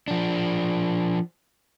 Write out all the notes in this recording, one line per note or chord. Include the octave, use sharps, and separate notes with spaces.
F3 D4